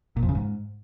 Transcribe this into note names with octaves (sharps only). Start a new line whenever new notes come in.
A#2
F2
C#3
G#2